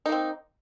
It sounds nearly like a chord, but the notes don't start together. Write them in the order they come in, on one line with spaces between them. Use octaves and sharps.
D#4 A#3 C4